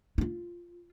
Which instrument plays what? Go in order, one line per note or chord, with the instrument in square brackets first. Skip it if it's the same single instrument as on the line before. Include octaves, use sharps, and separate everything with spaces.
[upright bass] E4 F4